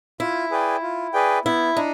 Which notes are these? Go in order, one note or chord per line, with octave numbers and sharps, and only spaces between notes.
E4 F4
G#4 B4 D5 G5
F4
G#4 B4 D5 G5
B3 E4
D4 D#4